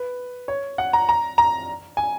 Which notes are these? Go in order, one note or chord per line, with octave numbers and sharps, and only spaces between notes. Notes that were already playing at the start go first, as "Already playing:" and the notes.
Already playing: B4
C#5
F#5
A#5
A#5
A#5
G#5